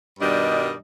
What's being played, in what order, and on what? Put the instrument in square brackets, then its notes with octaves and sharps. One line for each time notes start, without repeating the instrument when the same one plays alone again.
[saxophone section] G2 B2 D#3 G3 D4 D#5